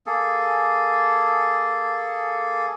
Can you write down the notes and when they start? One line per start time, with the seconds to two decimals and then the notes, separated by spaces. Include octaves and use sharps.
0.06 A#3 G#4 A4